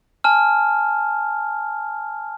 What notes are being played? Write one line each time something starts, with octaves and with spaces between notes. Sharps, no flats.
G#5 A5 F6